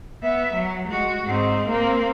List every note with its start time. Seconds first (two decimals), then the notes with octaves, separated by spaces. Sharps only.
0.23 B3 E5
0.53 F#3
0.87 G#3 F#4
1.24 G#2 C4
1.69 A#3 C4